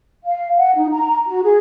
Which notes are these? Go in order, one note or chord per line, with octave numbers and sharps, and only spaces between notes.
F5
F#5
D#4
A#5
F#4
G#4